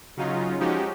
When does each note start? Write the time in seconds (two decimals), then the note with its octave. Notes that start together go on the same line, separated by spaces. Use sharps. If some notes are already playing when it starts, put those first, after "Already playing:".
0.17 C#3 F#3 C#4 D#4 F4
0.60 F3 G#3 C#4 D#4 F#4 G4